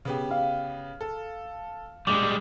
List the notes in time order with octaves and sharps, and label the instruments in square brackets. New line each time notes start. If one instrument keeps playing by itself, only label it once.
[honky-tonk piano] C#3 B3 G4
[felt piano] F5
[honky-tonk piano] A4
[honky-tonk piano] A#2 D4 [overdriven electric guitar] G3 G#3 [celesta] D6